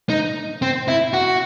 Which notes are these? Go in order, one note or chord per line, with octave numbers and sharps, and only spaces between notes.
D#4
C4
E4
F#4